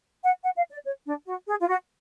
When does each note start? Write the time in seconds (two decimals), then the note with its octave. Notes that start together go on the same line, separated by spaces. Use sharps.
0.23 F#5
0.43 F#5
0.56 F5
0.71 D5
0.85 C#5
1.06 D4
1.27 F#4
1.47 G#4
1.59 F4
1.67 F#4